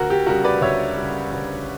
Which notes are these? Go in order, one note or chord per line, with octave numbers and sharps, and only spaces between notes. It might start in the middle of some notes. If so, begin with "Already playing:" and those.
Already playing: D2 F#4 A#4
G4
C#3 G3 F#4 A#4
B4 D5
D2 C#5 E5
G3
C#3
D2